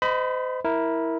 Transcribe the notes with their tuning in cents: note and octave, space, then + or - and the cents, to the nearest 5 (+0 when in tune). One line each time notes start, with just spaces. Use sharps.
C5 -35 D#5 +0 B5 +10
E4 -10 A#4 +0